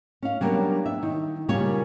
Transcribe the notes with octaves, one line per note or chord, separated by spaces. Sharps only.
C#4 F5
F#3 G3 A#3 B3 C#4 D4
E5
D#3
A#2 C#3 G3 A#3 C#5